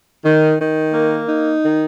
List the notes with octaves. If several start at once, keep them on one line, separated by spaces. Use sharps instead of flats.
D#3
D#3
A#3
D#4
D#3